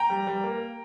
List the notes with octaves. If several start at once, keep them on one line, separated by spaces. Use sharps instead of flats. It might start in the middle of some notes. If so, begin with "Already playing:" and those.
Already playing: G5 A#5
G3
G3
A#3